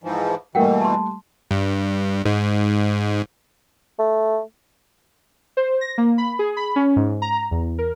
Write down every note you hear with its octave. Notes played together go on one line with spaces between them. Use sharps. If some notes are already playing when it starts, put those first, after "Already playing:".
G#2 E3 F3
B2 E3 G3 A3 A#3 A#4 F#5 G5
A5 C6
G2
G#2
A3
C5
A#6
A#3
B5
G#4
B5
C#4
G#2
A#5
E2
A#4